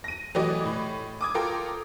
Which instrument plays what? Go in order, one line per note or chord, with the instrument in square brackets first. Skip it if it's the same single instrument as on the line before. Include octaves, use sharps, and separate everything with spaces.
[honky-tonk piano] A#6 D#7
E3 F#3 A3 G4 D5 D#5
A2
D6 D#6 G#6
F4 A4 A#4 G5